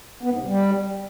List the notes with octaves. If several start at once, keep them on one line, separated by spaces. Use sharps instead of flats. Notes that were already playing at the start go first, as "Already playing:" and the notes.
B3
G#2
C3
G3